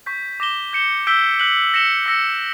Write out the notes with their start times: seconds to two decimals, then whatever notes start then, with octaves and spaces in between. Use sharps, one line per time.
0.06 C#6 G6 B6
0.40 D6 A#6 E7 G7
0.73 G6 C#7 E7 G7
1.07 E6 G6 B6 D7 G7
1.40 F#6 B6 F#7
1.74 A#6 C#7 E7 G7
2.06 E6 A#6 C#7